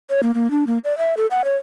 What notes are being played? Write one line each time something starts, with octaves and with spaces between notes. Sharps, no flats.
C#5
A#3
A#3
D4
A#3
D5
E5
A4
F#5
C#5